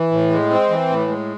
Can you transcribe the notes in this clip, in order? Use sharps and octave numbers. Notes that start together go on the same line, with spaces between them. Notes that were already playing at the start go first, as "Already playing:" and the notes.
Already playing: E3
A2
G#3
C4
E3
A2
G#3